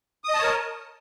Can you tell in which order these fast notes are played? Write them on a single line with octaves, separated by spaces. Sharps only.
D#6 D#5 A5 C#5 A#4